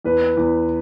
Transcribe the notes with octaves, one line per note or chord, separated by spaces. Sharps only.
E2 B4
E2